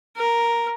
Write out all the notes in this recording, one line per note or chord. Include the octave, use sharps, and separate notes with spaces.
A#4